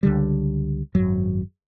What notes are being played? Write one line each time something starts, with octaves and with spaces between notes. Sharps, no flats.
C#2 D3 G3
G#1 F#2 F#3